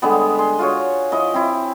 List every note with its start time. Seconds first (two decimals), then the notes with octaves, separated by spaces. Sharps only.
0.02 D3 G3 G#3 B3
0.39 G#4 C6
0.59 F4 F#4 C#5
1.12 F3 E4 D#5
1.34 C4 E4